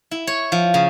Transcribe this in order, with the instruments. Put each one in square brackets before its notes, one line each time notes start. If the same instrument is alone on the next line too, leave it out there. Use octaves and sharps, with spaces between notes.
[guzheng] E4
C#5
F3
C#3